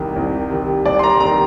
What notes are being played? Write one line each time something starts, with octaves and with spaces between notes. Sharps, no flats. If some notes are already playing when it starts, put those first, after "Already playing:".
Already playing: C2 C3 D#3
C2
C3 D#3
C2 D5
C6
A#5
C3 D#3 A#5